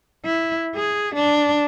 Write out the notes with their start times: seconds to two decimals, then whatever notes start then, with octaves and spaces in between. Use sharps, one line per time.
0.25 E4
0.75 G#4
1.15 D4